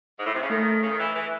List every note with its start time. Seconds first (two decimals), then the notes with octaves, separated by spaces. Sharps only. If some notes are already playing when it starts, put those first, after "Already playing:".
0.20 G#2
0.26 A2
0.35 C3
0.43 C#3
0.50 D#3 A3
0.83 C#3
0.91 D#3
1.00 E3
1.15 E3